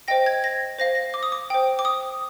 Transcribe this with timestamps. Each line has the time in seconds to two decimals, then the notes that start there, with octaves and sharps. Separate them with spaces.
0.08 C5 D#5 G5 A#6
0.26 G#6
0.44 A#6
0.79 C5 F5 A#6
0.95 A#6
1.14 D6
1.23 D#6
1.32 D6
1.50 C5 G5
1.79 D6
1.85 D#6